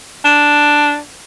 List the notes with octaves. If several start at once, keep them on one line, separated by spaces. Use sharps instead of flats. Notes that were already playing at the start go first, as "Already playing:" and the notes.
D4